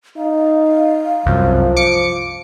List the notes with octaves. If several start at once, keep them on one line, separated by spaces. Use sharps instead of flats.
D#4 F5
C2 F#2 F3
D6 C#7